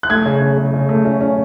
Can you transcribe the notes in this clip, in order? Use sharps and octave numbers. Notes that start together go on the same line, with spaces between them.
F#6
A3 G#6
C#3
C#3
C#3
C#3
A3
C#4
C#4